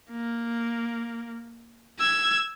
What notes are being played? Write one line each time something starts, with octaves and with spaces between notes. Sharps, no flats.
A#3
E6 G#6